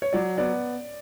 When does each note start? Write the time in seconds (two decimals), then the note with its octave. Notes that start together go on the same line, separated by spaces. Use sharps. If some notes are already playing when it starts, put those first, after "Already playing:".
0.02 C#5
0.13 F#3 D5
0.37 B3 D5